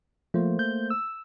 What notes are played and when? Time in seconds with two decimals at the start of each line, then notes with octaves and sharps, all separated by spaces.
0.34 F3 A3 A#3 C5
0.59 G6
0.90 E6